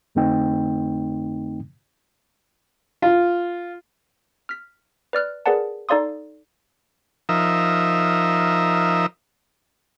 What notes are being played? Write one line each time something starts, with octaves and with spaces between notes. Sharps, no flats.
F2 D3 A3 C4 D#4 G5
F4
F6 B6
B4 D5 F6 F#6
G#4 A#4 B4 D5 F#5 A5
D#4 A4 D5 F5 C6 D#6
F3 D#4 A#4 E5